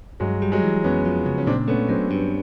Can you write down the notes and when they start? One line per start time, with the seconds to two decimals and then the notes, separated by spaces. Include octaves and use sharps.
0.20 G2 F#3 G#3
0.42 G3
0.52 F#3 G#3
0.63 E3
0.84 F2 B3 C#4
1.05 F3
1.26 C#3
1.38 C#4
1.47 A#2 C4 D4
1.68 A3 B3 C#4
1.89 F#3 C4 D4
2.11 G2